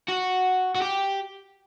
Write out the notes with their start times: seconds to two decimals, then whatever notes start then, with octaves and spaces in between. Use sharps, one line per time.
0.09 F#4
0.75 F#4
0.81 G4